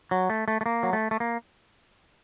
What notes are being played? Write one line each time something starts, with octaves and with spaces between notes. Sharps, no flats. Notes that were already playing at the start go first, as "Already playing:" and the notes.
F#3
A3
A3
A3
A#3
F#3
A3
A3
A#3